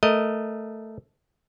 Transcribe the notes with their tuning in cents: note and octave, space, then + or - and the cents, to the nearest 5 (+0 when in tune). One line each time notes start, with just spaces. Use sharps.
A3 +0 A#4 +0 D#5 +0